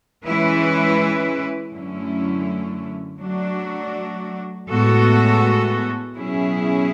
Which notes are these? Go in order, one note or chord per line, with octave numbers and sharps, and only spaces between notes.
E3 G#3 C#4 E4 B4
F#2 D3 A3 C#4 E4
F#3 A3 D4 F#4
A2 G#3 B3 F#4 A4
B2 F#3 C#4 E4 G#4